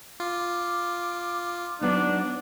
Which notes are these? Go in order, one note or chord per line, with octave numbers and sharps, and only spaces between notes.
F4 D6
F#3 B3 D4 D#4